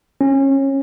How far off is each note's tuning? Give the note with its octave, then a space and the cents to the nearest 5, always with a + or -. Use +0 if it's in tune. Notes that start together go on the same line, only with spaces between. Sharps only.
C#4 -25